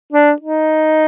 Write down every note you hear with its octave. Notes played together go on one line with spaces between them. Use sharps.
D4
D#4